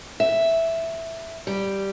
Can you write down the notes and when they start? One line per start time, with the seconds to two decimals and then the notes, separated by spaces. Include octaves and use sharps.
0.20 E5
1.47 G3